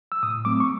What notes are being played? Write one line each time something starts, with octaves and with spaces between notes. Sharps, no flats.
E6
A2 D#6
F#3 A3 C4 D6
C#6